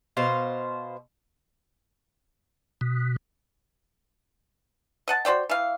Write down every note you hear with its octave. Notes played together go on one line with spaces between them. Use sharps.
B2 C5 F5
B2
D#5 F#5 A5
F#4 C5 D5 G5
E3 F5